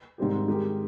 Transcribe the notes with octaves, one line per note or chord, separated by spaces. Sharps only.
G#2 D#3 G3 C4 G4
D#3 G#3 D#4 G4 A#4